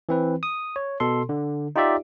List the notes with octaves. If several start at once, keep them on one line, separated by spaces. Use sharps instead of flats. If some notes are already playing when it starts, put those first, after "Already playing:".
E3 C4 B4
D#6
C#5
B2 A4 C6
D3
D#4 F4 G4 D5 E5